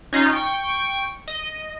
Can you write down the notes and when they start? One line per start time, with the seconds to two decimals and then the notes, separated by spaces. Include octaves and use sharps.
0.13 C#4 D#4 F4
0.33 G5 C#6
1.28 D#5